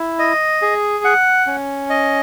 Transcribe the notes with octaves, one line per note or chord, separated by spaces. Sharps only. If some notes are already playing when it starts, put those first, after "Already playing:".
Already playing: E4
D#5
G#4
F#5
C#4
D#5